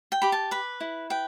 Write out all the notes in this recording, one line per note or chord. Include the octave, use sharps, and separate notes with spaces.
G5
G4 B5
A5
B4 B5
E4
B4 G5